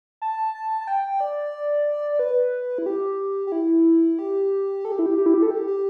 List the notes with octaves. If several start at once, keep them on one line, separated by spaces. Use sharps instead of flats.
A5
A5
A5
G5
D5
B4
E4
G4
G4
E4
G4
A4
G4
E4
G4
G4
E4
G4
A4
G4
G4